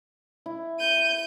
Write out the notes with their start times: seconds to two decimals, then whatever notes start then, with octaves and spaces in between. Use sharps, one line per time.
0.46 E4
0.79 G6 D#7